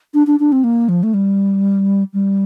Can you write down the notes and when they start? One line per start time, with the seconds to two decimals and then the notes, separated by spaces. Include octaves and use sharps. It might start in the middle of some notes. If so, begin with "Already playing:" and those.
0.14 D4
0.27 D4
0.40 D4
0.52 C4
0.64 A#3
0.89 F3
1.03 A3
1.14 G3
2.13 G3